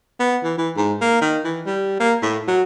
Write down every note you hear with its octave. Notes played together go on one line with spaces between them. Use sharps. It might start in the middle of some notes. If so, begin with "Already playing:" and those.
B3
E3
E3
G#2
A#3
D#3
E3
G3
A#3
A2
F#3